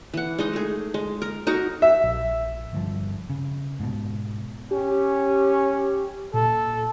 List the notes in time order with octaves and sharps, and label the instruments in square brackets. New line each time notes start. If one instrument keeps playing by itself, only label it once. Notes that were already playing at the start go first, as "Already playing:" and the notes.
[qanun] E3 F#5
G#3 D#4 D#5
A3 G#4
G#3
A#4
D#4 F#4 A#4
[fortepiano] E5
[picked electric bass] A#1
G1 G2 F3
C#3
G#2 B2
[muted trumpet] C#4 [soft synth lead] G4
[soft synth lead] A#2 [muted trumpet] A4